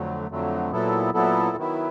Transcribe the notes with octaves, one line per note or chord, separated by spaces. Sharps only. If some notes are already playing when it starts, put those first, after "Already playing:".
Already playing: F2 D3 F#3 A3
F2 D3 F#3 A3
A#2 F#3 B3 E4 A4
A#2 F#3 B3 E4 A4
D#3 F#3 B3 E4